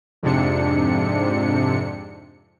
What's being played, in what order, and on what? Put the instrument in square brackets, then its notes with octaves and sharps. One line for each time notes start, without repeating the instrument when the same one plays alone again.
[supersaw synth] F2 G#2 C3 D4 C#7